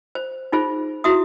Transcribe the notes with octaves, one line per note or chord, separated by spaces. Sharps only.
C5
D#4 F4 G#4 C5
E4 F#4 E5 D#6